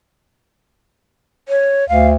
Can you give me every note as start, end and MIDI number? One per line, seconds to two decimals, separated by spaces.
1.49 1.87 73
1.89 2.16 38
1.89 2.07 77